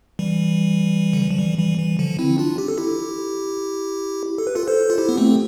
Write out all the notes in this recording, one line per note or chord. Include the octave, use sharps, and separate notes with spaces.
E3 G3
D3
E3
F3
E3 G3
E3 G3
E3
D3 F3
C4 E4
D4 F4
G4
A4
E4 G4
A4
B4
F4 A4
A4 C5
F4
E4 G4
B3
A3 C4